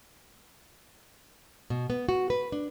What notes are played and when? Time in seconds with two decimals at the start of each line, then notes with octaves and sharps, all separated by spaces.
1.70 B2
1.90 B3
2.09 F#4
2.30 B4
2.52 D4